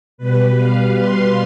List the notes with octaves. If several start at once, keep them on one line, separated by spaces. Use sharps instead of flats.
B2 G3 B4
F5
C6